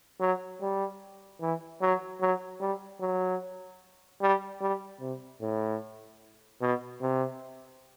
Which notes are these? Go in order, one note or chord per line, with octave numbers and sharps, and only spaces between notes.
F#3
G3
E3
F#3
F#3
G3
F#3
G3
G3
C3
A2
B2
C3